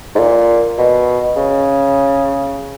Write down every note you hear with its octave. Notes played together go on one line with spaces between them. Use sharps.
G#2
A#2
B2
C#3